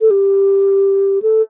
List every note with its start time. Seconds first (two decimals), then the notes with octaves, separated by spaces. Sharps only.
0.01 A4
0.11 G4
1.22 A4